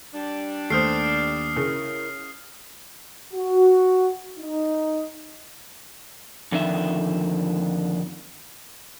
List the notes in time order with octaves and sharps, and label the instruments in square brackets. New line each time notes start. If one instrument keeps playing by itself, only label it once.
[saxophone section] G3 D4
[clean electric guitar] D#2 [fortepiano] A3 C5 [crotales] D#6 F6 C7
[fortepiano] C#3 [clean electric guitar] E4 A#4 C#5
[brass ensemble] F#4
D#4
[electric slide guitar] F2 D3 D#3 E5